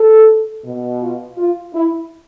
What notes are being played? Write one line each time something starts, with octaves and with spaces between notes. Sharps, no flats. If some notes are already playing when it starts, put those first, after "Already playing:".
Already playing: A4
B2
F4
F4
E4